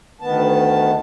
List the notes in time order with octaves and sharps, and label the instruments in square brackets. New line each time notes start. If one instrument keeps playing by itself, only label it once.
[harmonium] D2 D#3 B3 A5